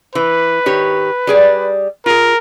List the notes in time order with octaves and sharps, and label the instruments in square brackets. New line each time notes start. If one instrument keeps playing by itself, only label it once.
[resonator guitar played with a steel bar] E3 [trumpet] B4
[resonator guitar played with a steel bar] D#3 G4 C#5
G3 G#4 D5
[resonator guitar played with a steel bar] F4 G#4 [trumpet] A#4